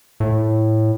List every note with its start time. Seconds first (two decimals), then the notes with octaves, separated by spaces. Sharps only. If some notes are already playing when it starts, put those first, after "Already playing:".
0.20 A2